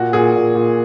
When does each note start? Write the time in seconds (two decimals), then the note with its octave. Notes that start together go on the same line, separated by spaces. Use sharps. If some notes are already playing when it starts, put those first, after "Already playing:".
Already playing: A#2 F#4
0.13 A#2 G#4
0.35 A#2
0.55 A#2